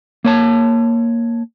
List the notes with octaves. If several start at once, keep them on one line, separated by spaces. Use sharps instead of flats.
A#3 C#5 A5